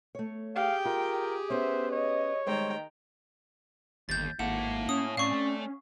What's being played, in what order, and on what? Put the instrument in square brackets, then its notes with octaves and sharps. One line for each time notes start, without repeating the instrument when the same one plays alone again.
[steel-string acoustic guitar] A3 C#5
[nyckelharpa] G4 G#4 [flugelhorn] F5 [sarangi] G5
[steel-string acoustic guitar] F4 [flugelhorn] A#4
[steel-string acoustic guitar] B3 C#4 [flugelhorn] C5 [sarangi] E5
[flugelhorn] C#5 [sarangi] D#5
[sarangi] D#3 [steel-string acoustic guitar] G3 G#3 C5 [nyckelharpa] G5 A#5
[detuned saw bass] G1 [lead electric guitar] D#2 [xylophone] G6 A6
[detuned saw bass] G#1 [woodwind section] A#3 [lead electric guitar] E4 A4 [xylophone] F#5
[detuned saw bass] C#4 [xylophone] D#6
[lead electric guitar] A2 [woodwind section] C4 D5 [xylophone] F5 C#6
[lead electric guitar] A3